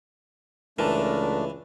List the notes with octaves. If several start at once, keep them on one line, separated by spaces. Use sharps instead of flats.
C#2 E3 A3 D4 A#4 B4 A5